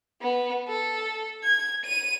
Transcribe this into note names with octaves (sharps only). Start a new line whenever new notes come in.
B3
A4
G#6
D#7